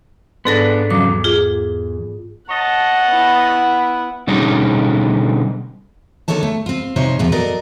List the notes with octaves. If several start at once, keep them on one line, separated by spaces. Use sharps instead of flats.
G#2 B3 D4 A4 A#6
F2 C#3 F#3 D6
E2
F4 G#4
C#5 D#5 F#5 A5
B3 E4
B2 D3 G3 C#4 D#4 G#4
A#2 D3 D#4 A4 C#5 A5
A3
C4 F4
C3 F3 D#4 C5 C#5
E2 A#2 F3
F#3 A4 A#4 D5 D#5